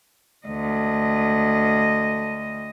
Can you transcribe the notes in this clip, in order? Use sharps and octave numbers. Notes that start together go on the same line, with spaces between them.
D2 D#5